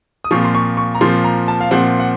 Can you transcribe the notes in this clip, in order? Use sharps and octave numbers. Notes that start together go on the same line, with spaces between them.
D#6
A#2 F3 C4 C#6
C6
C#6
C#6
A#5
A#2 F3 C4 C6
A#5
A5
F5
A#2 F3 C4 F#5
F#5